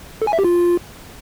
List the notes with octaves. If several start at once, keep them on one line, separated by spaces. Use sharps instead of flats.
A4
G#5
E5
G4
F4